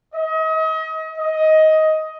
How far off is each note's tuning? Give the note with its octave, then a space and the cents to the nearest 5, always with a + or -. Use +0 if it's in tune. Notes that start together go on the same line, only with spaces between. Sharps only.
D#5 +35
D#5 +15